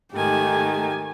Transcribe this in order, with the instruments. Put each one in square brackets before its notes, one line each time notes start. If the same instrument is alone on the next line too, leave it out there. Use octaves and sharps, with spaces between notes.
[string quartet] G#2 D#3 G#5 [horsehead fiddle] A3 G4